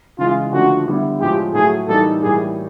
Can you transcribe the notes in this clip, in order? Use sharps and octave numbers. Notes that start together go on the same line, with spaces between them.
C#3 E3 G#3 F4
D3 F3 A3 D4 F#4
D3 G3 B3 E4
A2 F3 G#3 G4
A2 F#3 A3 G#4
A2 E3 G3 A#3 D#4 A4
A2 E3 G3 A#3 G#4